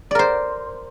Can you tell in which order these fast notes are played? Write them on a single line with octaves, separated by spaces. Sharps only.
D5 A#4 C5